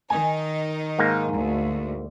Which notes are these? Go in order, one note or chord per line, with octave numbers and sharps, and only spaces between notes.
D#3 D#4 G#5
G#2 A#3
D2